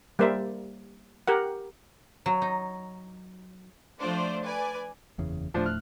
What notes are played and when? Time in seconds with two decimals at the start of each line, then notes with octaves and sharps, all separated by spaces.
0.19 G3 A#3 A#4 C5 D5 E5
1.27 G4 A#4 F#5
2.26 F#3
2.42 D#4
3.99 F3 A3 D4 F4 C5 D5
4.45 B4 D5 G#5
5.18 F#1 E2 C#3
5.54 D1 A2 F3 A3 D4 C5
5.66 F6 F#6